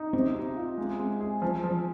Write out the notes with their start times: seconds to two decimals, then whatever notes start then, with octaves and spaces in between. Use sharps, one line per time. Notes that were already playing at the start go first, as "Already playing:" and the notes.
Already playing: D#4
0.13 C3 C4
0.35 C3
0.56 F4
0.78 G#3
1.00 G#3
1.21 G#4
1.42 F3
1.64 F3